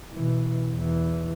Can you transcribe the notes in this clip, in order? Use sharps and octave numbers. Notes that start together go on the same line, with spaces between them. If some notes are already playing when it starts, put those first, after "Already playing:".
B2 E3
E2 E3